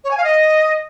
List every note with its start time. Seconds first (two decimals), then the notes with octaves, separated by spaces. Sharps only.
0.04 C#5
0.11 G#5
0.17 F5
0.24 D#5